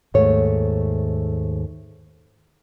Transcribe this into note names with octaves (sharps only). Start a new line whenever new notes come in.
D#2 G#2 A3 C#5